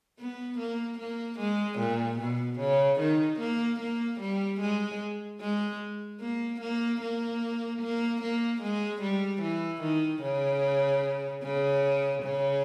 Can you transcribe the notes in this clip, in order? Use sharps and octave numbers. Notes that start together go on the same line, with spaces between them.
B3
A#3
A#3
G#3
A#2
B2
C#3
D#3
A#3
A#3
G3
G#3
G#3
A#3
A#3
A#3
A#3
A#3
G#3
G3
E3
D#3
C#3
C#3
C#3